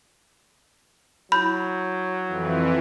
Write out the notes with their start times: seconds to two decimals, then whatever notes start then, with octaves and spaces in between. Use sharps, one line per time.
1.32 F#3 E4 B5 G6
2.27 F2 E3